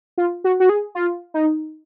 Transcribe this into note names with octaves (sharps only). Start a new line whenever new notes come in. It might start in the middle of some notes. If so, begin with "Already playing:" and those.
F4
F#4
F#4
G#4
F4
D#4